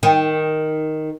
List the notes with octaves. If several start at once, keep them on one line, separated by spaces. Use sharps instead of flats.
D#3